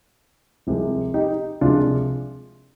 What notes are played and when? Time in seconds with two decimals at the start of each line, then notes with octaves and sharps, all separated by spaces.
0.67 C2 C3 F3 G#3
1.14 D#4 G4
1.61 C2 C3 F3 G#3 D4 F4